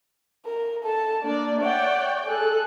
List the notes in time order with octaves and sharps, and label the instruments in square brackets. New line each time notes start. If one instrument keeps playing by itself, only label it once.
[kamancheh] A#4
A4 A5
[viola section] A#3 D5 [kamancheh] D4
[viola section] C#5 D5 G5 [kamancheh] E5 F#5
[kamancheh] G#4 F#6 [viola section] A4